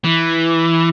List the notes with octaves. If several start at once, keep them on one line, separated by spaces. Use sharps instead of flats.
E3